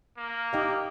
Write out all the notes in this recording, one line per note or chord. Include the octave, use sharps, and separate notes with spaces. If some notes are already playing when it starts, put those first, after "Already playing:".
A#3
D#4 G4 D#5 F5